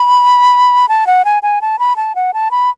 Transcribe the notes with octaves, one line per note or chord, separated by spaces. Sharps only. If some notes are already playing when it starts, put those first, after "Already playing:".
Already playing: B5
A5
F#5
G#5
G#5
A5
B5
A5
F#5
A5
B5